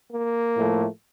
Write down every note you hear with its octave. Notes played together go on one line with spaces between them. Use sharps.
A#3
A2 F3 A3